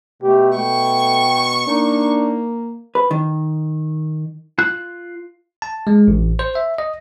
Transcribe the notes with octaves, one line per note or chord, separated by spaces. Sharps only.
B2 A3 G4
A3 G5 C#6
A#3 D4 D#4
B4
D#3
F4 F#6
A5
G#3
A1
C5
E5
D#5